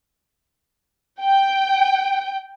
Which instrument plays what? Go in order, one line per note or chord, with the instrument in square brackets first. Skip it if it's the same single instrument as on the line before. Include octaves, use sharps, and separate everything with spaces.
[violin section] G5